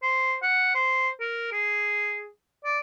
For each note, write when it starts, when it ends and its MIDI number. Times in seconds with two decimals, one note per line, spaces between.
0.03 0.35 72
0.42 0.73 78
0.75 1.09 72
1.20 1.51 70
1.52 2.29 68
2.65 2.79 74